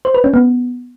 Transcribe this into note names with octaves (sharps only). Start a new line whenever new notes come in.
C5
B4
C#4
B3